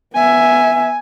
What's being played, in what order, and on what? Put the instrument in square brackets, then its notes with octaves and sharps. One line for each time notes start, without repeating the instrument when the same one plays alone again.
[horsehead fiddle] B3 E5 [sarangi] G#5